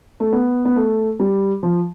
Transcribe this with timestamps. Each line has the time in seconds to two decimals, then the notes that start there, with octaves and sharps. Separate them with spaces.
0.20 A3
0.33 B3
0.65 B3
0.76 A3
1.20 G3
1.63 F3